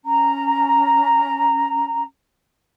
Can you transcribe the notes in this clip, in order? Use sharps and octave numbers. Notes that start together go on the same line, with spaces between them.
C#4 A#5